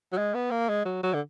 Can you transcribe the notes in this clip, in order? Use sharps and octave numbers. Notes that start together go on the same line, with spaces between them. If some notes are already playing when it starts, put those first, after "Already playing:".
F#3
G#3
B3
A#3
G#3
F#3
F#3
D3